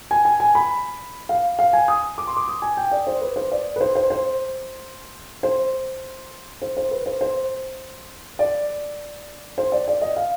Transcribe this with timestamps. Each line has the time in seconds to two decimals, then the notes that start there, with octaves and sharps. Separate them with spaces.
0.11 G#5
0.25 G#5
0.40 G#5
0.55 B5
1.29 F5
1.59 F5
1.73 G#5
1.88 D#6
2.18 D6
2.27 C6
2.36 D6
2.48 D#6
2.62 G#5
2.77 G5
2.91 D5
3.07 C5
3.21 B4
3.36 C5
3.52 D5
3.76 B4
3.80 C5
3.95 C5
4.10 C5
5.43 C5
6.62 C5
6.77 C5
6.91 B4
7.06 C5
7.21 C5
8.39 D5
9.58 C5
9.72 D5
9.88 D5
10.02 D#5
10.16 F5